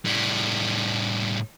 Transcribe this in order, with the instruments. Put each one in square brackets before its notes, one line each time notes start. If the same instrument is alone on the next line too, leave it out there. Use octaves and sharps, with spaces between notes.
[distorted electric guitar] A2 G3